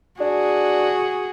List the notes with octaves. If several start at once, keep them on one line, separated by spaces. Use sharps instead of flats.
D4 F#4 G#4